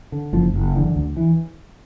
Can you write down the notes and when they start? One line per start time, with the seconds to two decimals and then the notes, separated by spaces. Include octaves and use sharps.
0.12 D3
0.33 F#1 F3
0.54 F#1
0.75 D3 E3
0.96 D2
1.17 E3